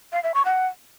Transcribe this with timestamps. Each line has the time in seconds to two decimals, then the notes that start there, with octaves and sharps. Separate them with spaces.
0.12 F5
0.23 E5
0.34 C#6
0.45 F#5